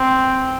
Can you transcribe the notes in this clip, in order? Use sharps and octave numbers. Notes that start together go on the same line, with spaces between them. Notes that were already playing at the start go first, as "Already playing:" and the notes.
Already playing: C4